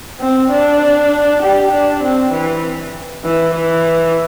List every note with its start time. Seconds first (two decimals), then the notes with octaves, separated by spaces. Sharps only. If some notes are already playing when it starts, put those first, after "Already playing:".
0.20 C4
0.51 D4
1.42 G4
1.72 D4
2.03 C4
2.33 E3
3.24 E3
3.54 E3